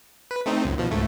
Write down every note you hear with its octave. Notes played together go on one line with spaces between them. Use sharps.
B4
A3 C4 D#4
C#2 F#2
B2 F3
C#2 G#2 A3